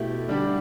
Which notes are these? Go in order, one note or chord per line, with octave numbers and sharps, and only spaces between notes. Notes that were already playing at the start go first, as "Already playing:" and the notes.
Already playing: B2 A3 E4 G4
D3 G3 D4 G4